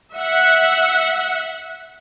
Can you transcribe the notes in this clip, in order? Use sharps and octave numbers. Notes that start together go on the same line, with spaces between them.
E5 F#5